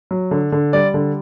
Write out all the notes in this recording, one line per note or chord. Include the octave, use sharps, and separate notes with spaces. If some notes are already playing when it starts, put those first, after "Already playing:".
F#3
D3
D3
G3 D5
D3